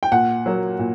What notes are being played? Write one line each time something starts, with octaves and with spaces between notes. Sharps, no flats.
G5
A#2 F#5
F#3 A#3
A#2